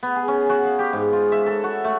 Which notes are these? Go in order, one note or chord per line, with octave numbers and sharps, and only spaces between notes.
B3
G#4
C#4
F#4
F5
G4
G#2
F4
E5
A4
F#4
A3